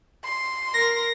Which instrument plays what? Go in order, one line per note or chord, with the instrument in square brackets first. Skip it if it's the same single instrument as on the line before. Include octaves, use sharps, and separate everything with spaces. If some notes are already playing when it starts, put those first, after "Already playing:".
[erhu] C6
[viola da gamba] A#4 [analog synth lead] A#6